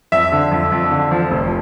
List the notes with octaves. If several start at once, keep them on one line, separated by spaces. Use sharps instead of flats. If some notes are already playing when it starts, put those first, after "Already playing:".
F2 E5
D3
F2
F2
D3
F3
F1